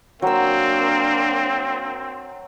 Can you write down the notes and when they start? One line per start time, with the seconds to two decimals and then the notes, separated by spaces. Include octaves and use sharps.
0.22 F#3 A#3 C4 D4 E6